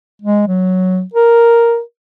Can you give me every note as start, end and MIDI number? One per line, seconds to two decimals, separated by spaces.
0.22 0.46 56
0.47 1.02 54
1.14 1.80 70